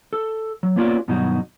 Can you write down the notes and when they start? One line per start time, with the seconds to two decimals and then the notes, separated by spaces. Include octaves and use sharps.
0.13 A4
0.63 F#3
0.76 A#3 B3 C#4 F4 F#4 D5
1.08 G2 B2 D#3 F#3 D#4 F#4